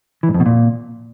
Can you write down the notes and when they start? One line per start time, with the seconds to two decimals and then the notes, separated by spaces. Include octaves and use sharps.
0.23 E3
0.29 G#2
0.34 F2
0.40 B2
0.46 A#2